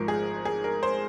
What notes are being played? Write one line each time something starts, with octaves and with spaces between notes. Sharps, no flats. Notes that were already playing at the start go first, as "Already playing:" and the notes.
Already playing: G#1 G#2 F3 A#4
G#4
G#4
A#4
C5